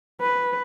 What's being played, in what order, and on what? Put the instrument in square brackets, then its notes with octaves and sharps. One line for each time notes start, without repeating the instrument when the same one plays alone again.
[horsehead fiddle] B4